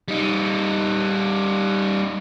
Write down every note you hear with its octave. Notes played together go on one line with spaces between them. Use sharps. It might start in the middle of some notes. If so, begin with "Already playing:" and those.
G3 D#4